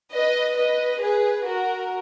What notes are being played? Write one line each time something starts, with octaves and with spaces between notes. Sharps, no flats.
B4 D#5
B4 D#5
G#4 B4
F#4 A#4